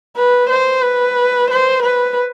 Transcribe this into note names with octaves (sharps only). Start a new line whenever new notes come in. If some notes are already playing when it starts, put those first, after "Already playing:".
B4
C5
B4
C5
B4